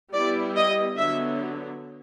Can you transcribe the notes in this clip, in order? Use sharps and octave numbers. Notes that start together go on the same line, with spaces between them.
G3 B3 E4 D5
D#5
D3 F#3 B3 E5